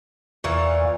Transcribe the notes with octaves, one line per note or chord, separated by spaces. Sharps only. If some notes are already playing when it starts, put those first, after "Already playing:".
E2 A#2 E3 F5 C#6